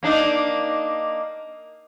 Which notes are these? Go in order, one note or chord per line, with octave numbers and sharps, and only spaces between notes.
A#3 D4 D#4